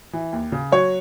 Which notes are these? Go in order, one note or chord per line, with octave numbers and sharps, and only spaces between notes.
E3
D#2
C#3
F#3 C#5